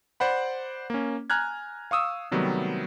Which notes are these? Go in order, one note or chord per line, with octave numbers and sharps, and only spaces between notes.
C5 D5 F#5 B5
A#3 C#4
G#5 A#5 F6 F#6 G#6
F5 C#6 D#6 E6
C3 D#3 F#3 G3 A3 B3